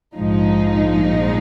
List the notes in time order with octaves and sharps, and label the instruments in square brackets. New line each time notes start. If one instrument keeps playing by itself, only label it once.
[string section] A#1 G#2 F3 G#3 D#4